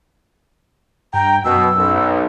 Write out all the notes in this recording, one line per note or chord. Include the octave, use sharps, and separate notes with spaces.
G2 G5 A#5
F#2 B2 E6
B1